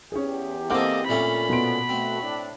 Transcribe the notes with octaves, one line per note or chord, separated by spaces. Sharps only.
E2 C#4 G4 G#4
A#3 C4 A4 C5 D#5 F#5 D6
A#2 A3 C#4 B5
B2 B3 C6 D7
A3 C4 F#4
A2 D4